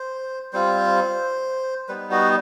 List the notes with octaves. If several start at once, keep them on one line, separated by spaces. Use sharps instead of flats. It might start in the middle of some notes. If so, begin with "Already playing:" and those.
Already playing: C5
G3 C4 F4 C5
G3 B3 D#4 B4
F#4